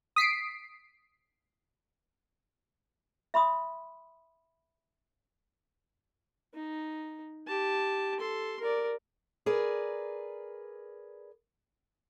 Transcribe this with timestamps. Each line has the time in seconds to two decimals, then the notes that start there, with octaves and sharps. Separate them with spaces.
0.16 D#6 B6 C7 D7
3.34 E5 B5 C6 D#6
6.54 D#4
7.47 G4 A5
8.20 A4 C6
8.60 A#4 D5
9.46 G#4 A#4 B4 D5